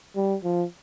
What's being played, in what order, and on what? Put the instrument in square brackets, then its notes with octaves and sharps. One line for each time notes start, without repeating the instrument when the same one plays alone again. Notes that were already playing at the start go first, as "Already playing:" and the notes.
[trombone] G3
F3